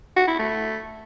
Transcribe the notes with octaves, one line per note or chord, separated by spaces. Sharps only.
F#4
E4
A3